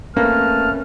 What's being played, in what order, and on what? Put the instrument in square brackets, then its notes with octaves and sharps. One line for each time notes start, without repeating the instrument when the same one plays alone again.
[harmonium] A3 B4 A5 [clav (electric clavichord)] A#3 [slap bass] C4 C#4 [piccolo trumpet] F6